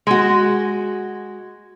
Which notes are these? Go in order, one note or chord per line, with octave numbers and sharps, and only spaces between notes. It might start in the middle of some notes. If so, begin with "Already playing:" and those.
G#3 F#4